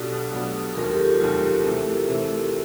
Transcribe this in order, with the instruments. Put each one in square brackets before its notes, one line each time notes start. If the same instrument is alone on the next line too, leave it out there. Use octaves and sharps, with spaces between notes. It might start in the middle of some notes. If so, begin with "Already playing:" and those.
Already playing: [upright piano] B1 B2 F#3 B3 D4 [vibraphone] G4 A4
[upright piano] B1 B2 F#3 B3 D4
[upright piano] F1 D#2 D#3 F#3 [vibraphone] G#4 A#4
[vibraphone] G4 A4
F4 G4
[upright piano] F1 D#2 D#3 F#3 [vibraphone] F4
[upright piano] C3 E3 A3
C3 E3 A3